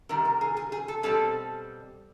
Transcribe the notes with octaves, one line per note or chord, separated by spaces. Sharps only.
C3 D#3 G3 A#4
A#4
G#4
G#4
G#4
A4
B2 G3 C4 A4